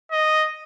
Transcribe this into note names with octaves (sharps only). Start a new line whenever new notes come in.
D#5